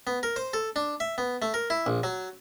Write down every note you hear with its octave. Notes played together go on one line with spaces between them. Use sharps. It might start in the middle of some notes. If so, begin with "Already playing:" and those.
B3
A#4
C5
A4
D4
E5
B3
A3
A#4
E4
A#1
F#3